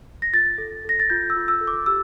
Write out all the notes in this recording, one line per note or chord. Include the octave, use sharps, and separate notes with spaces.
A#6
F4 A6
A4
A4 A#6
A6
F4 G6
E6
F4
E6
A4
D6
G4 E6